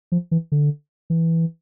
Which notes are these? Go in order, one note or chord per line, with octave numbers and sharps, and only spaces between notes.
F3
E3
D3
E3